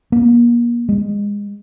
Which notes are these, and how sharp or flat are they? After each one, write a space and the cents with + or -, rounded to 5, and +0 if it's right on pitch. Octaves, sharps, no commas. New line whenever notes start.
A#3 +35
G#3 -25